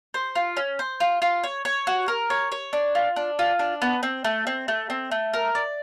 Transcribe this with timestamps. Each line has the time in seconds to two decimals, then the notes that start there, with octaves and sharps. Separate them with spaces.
0.14 C5
0.35 F4
0.57 C#4
0.79 C5
1.00 F4
1.22 F4
1.44 C#5
1.65 C#5
1.87 F#4
2.08 A#4
2.30 C#5
2.52 C#5
2.73 D4
2.95 F4
3.16 D4
3.39 F4
3.59 D4
3.82 B3
4.03 C4
4.24 A3
4.47 C4
4.68 A3
4.90 C4
5.11 A3
5.34 A#4
5.55 D5